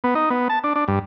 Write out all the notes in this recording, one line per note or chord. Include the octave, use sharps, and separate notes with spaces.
B3
D#4
B3
A5
D4
D4
G2